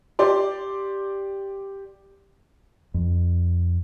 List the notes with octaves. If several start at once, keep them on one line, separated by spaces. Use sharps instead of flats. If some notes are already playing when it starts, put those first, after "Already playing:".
G4 D5 C6
F2